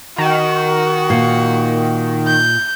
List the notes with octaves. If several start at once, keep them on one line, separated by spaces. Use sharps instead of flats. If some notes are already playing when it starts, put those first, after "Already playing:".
D#3 F#4
A#2
G6